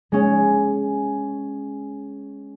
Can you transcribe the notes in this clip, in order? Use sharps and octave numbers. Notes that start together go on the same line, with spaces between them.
G#3 C#4